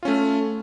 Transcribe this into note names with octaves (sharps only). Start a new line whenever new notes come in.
A3 C#4 F4